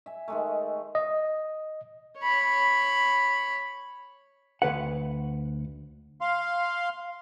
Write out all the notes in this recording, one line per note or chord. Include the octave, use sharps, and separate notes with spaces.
E5 G#5
D#3 G#3 A3
D#5
C#5 B5
D2 B4 F#5
F5 C6